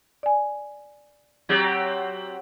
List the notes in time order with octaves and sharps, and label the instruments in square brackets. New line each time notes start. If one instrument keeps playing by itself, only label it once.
[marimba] D5 G#5
[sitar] F#3 C4 G4